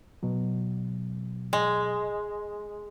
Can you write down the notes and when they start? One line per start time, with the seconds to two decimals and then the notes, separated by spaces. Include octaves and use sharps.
0.23 B2 F#3
1.53 G#3